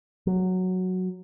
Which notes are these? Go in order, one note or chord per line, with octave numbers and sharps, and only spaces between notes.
F#3